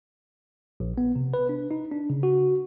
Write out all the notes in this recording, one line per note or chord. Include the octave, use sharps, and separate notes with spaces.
A#1
B3
C3
B4
D4
D#4
D4
C#3
F#4